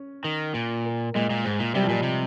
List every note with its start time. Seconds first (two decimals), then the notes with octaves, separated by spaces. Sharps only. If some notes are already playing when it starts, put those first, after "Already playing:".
Already playing: C#4
0.24 D#3
0.54 A#2
0.85 A#3
1.15 A#2 G#3
1.30 A#2
1.45 G#2
1.60 A#2
1.75 C3 G3
1.83 F3
1.89 A#2 G3
2.03 C3